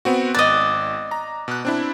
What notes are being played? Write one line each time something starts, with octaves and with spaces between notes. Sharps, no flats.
B3 C4 F#4
G#1 D5 D#5 F#6
A#5
B2 F#6
C4 D4 E4